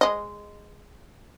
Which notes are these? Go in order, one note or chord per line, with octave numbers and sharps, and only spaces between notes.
G#3 D#5